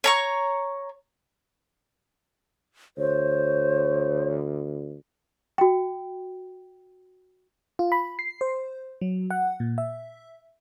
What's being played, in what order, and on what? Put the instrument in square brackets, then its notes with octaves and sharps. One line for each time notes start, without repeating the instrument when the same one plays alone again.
[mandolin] C#5 A#5 C#6
[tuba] D2 [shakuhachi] C5 [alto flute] C#5
[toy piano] F#4 G5
[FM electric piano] F4
B5
C7
C5
F#3
F#5
A#2
E5